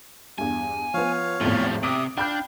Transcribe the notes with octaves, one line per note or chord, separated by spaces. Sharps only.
E2 G2 G#5
F3 B3 C#5 F5
G#1 E2 A2 F3 G3
C3 G4 E5 D#6 D7
D4 F5 G5 B5 G6